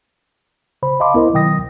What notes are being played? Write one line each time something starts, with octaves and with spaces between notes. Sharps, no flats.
C#3 C5 B5
D#5 F5 A5 B5 C6 D6
B3 E4 A#4 C5 D#5
B2 D#3 F#3 G5 D#6 A#6